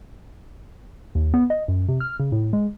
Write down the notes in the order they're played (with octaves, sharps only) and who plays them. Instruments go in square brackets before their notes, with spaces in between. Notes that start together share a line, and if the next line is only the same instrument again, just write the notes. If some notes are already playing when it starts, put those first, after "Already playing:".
[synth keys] D#2
B3
D#5
F#2
C3
F6
C#3
A2
G#3